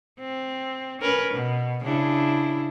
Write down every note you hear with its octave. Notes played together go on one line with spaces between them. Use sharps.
C4
C#4 A#4 B4
B2
C#3 D4 E4